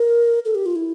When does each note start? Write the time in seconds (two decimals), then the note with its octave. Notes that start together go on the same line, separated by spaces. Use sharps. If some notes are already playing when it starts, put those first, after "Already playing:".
Already playing: A#4
0.45 A4
0.55 G4
0.66 F4
0.76 E4